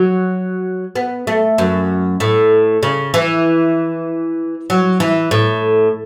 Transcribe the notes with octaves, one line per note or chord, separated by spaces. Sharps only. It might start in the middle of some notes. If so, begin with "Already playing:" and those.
Already playing: F#3
B3
A3
F#2
A2
C#3
E3
F#3
E3
A2